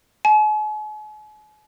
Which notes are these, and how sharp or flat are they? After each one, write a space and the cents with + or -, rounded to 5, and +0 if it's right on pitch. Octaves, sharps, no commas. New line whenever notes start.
G#5 +45